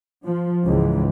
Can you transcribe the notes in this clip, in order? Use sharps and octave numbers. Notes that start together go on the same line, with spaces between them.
F3
C#2 G#2 E3